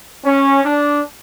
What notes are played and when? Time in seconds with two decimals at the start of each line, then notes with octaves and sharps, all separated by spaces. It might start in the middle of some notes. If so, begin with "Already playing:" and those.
0.24 C#4
0.64 D4